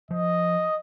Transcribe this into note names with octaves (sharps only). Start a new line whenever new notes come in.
F3 D#5